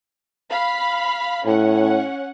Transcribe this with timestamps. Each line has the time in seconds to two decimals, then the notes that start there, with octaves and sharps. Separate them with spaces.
0.50 F5 B5
1.46 A2 C#4 F#5